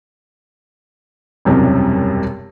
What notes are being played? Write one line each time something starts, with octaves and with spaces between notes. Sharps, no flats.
E1 C2 F#2 C3 G3 C#4